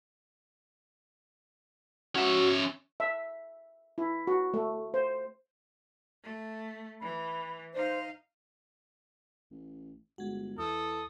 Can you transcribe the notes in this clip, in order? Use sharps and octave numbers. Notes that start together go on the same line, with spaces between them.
C#4 F#4 E5
E5
E4
F#4
A3
C5
A3
E3 B5
D#4 C5 F5
A1
G1 G#3 F#4
E2 E3 A4 D#6